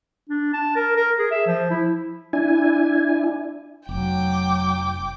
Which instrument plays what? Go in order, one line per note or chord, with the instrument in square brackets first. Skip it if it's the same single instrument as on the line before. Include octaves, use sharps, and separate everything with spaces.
[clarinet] D4
A5
A#4
A#4
G#4
E5
F3
E4
[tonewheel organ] D4 E4 G#5
[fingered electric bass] F1 [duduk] F#3 [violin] G5 D6